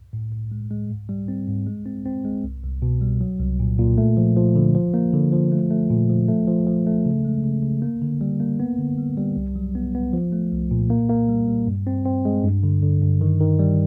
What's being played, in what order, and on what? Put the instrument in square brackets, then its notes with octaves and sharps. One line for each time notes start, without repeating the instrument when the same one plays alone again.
[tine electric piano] A2
A2
G#3
G#3
G#2
G3
C4
G#2
G#3
C4
C4
G#3
C2
C2
B2
G3
F#3
C2
A#2
A#2
A3
F3
F3
D3
F3
A#3
D3
F3
A3
A3
A#2
F3
A3
F3
F3
A3
C#3
G#3
C#3
C#3
A#3
D3
G3
A#3
B3
D3
G3
G3
C2
F#3
B3
B3
F3
A3
C2
A#2
A#3
A#3
G3
G3
G2
C4
C4
G#3
G2
D3
D3
G2
D#3
D#3
G3